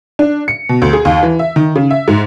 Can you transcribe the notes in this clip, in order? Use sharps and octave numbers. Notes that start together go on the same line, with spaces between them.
D4
C#7
B2
D2
G#4
D#2
E3
E5
D#3
C#3
E5
G#2